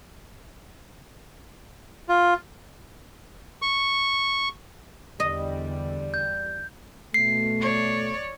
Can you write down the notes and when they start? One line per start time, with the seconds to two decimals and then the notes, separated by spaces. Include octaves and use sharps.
2.09 F4
3.62 C#6
5.20 E2 D3 G3 D5 D#5
6.14 G6
7.14 B2 A3 C7
7.61 C#5 D5